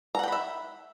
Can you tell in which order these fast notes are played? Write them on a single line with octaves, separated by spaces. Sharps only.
A#5 F#5 G5 B5 E5